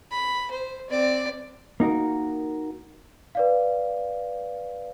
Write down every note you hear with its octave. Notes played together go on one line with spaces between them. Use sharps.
B5
C5
C4 D5
A#3 D#4 F#4 A#4
B4 D5 F5